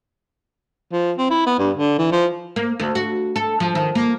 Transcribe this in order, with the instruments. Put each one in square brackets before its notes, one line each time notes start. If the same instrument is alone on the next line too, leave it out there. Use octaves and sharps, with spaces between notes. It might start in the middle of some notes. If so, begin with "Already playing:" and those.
[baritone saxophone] F3
C4
E4
B3
G2
D3
E3
F3
[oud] A#3
D2
F#4
A4
F3
D#3
A#3